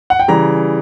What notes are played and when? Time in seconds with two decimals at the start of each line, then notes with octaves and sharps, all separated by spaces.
0.10 F#5
0.20 G5
0.28 C#3 E3 G3 A#5